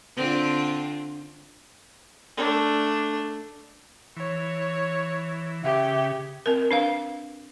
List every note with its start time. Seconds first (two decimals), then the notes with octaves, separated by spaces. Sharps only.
0.15 D3 C4 F4
2.37 A3 D4
4.17 E3 C#5
5.64 C#3 G4 E5
6.46 C4 A#4
6.71 D4 B4 F5